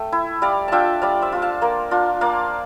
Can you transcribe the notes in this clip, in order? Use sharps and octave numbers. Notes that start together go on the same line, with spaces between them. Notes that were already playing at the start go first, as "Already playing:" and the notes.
Already playing: A3 G5
E4
G3 D5 F5
D4 F4 E5 G5 A5
G3 D5 F5
C5 E5
D4 F4
F5 A5
A#3 A#4 D5
D4 F4
A#3 D5 F5